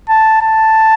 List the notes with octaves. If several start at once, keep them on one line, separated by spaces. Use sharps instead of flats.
A5
A5